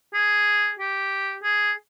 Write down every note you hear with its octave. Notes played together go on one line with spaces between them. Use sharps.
G#4
G4
G#4